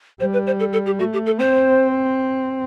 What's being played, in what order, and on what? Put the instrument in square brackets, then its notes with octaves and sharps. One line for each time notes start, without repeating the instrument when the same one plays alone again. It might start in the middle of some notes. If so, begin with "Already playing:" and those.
[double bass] G3 [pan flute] C5
[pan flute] B4
C5
A4
A4
G4
[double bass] A3 [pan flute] F#4
[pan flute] G4
A4
[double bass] C4 [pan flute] C5